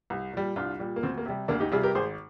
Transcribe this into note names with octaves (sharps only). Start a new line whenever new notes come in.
C2
A#2 G3
C2 D4 F4
A#2 G3
A#3
D2 C4
A#3
C3 G3
D2 A#3 D4
D#4 G4
C3 G3 F4 G#4
G4 A#4
G#1 G#4 C5